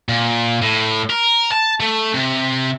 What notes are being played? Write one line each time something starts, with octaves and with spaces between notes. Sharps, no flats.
A#2
A2
A#4
A5
A3
C3